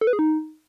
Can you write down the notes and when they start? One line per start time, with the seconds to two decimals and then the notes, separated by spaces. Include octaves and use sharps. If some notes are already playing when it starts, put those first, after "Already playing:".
0.01 A4
0.07 B4
0.13 G#4
0.19 D#4